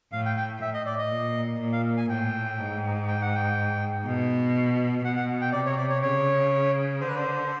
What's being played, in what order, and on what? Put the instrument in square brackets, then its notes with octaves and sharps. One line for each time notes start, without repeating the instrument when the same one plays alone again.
[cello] A2 [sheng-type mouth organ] F5
[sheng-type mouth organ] G5
G5
[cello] A2 [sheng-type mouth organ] E5
[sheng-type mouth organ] D#5
D5
D#5
[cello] A#2
A#2
[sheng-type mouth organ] F5
G#5
[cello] A2 [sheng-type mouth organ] G5
[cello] G#2
[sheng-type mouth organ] G5
F#5
G5
[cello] B2
[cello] B2 [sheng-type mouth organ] F#5
[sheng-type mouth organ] F#5
G5
[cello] C3 [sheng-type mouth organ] D5
[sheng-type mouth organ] C#5
D5
C#5
[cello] C#3 [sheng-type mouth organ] C#5
[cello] D3 [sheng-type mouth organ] C5
[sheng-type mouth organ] B4
C5